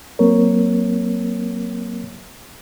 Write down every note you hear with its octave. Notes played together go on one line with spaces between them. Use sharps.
F#3 A#3 C4 A#4 C#5